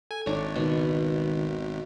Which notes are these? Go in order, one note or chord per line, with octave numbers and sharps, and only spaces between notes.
A4 G#5
G#1 D4 C#5
C#2 B2 D#3